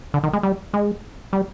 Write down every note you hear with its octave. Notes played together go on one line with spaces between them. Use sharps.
D3
D#3
G#3
G3
G#3
G3